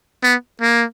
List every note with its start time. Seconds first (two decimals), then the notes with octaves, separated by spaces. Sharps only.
0.23 B3
0.62 A#3